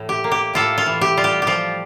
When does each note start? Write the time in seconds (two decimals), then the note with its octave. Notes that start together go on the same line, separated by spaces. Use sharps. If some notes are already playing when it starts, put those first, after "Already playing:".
Already playing: A2 E3
0.09 G4
0.24 A#3
0.32 G4
0.53 A2 F4 A4
0.78 F4
0.86 E3
1.01 G4
1.17 G3 F4
1.24 G4
1.42 G4
1.47 F3 F4